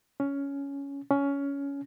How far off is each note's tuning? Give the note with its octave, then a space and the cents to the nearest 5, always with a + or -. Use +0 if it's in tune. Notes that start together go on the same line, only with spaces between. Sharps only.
C#4 +10
C#4 +15